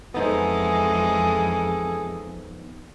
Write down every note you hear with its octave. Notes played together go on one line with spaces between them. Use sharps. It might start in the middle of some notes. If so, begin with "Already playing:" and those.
F2 E3 G#3 B3 D#4 G#4 A4 C5